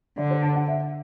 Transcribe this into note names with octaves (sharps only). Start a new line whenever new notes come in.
D3 D5
C5
A5
F#5
E5